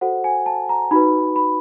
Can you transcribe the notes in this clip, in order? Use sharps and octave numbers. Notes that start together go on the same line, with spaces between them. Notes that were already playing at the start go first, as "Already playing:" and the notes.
F#4 A4 C5 F#5
G#5
A5
A#5
D#4 F#4 B4 B5
B5